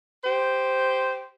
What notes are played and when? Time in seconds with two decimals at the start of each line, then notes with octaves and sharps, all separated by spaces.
0.24 G4 C5